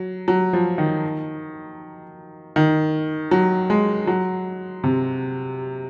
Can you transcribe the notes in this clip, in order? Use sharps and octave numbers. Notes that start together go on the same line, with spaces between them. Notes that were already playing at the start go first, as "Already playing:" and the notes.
Already playing: F#3
F#3
F3
D#3
D#3
F#3
G#3
F#3
C3